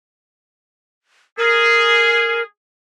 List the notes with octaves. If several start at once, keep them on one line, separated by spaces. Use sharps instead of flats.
G#4 A#4